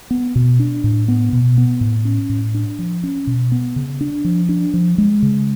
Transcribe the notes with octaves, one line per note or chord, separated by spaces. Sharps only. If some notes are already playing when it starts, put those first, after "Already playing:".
B3
B2
D4
A2
B3
B2
B3
A2
C#4
A2
D4
F3
C#4
B2
B3
C#3
D4
F3
D4
F3
G#3
C#3